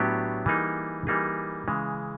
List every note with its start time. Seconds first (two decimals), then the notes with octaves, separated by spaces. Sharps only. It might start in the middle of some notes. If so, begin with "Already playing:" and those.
Already playing: A2 F#3 B3 D4 G4
0.46 E3 G3 A#3 D#4 G#4
1.07 E3 G3 A#3 D#4 G#4
1.68 C#3 E3 G#3